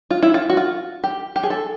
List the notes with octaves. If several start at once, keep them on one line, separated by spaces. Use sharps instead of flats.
F4
E4
F4
F#4
F4
G4
G4
G#4
A4